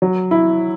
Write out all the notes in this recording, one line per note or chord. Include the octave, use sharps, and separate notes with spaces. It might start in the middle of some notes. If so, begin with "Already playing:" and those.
F#3
E4